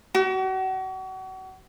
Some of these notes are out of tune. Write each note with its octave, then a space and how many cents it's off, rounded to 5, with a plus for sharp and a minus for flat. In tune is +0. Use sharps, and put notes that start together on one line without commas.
F#4 +35